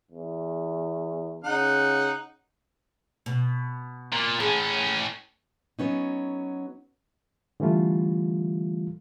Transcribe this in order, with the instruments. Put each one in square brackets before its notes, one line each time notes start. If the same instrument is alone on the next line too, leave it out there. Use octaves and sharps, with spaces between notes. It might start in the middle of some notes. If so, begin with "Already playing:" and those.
[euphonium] E2
[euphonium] C#3 [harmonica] D#4 F#5
[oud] B2
[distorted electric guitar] A#2
[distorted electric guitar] A2 C#4 [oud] G#4
[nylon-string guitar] F#3 B3 C#4 D#4
[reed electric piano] D3 E3 G3 A3 F4